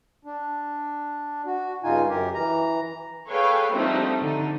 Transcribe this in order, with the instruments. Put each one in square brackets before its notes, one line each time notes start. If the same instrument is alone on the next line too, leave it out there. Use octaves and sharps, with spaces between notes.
[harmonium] D4
F#4
G2 C#3 D#4 F4 G#5
F#2 G4 A#4
E3 A#5
[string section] G#4 A4 B4 C#5 F5 G5
F3 G3 A3 C4 D4 D#4
D3 D#4